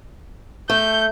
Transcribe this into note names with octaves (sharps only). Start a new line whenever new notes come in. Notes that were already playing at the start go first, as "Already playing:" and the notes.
A3 G6